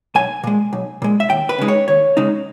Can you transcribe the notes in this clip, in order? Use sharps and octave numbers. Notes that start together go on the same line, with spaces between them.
B1 G#5
A#2 G#3
B1
A#2 G#3
E5
D#2 G5
B4
C#3 G#3 D#4
C#5
D#2 C#5
C#3 G#3 D#4